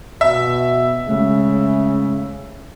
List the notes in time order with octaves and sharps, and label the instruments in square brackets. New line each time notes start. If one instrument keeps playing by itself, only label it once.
[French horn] B2 [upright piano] E5
[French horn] C#3 [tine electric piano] G#3 A3